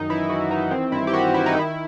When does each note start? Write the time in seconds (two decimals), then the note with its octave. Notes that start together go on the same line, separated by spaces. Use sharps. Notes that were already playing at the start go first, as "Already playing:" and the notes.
Already playing: F#2 D#3 D#4
0.10 E3 E4
0.30 E3 F#4
0.51 E3 D#4
0.71 D#3 C4
0.92 G2 E4
1.07 G4
1.13 D#3 F#4
1.33 G2 E4
1.46 D#4
1.54 D#3 E4